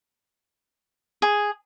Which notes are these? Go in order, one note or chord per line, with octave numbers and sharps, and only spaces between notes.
G#4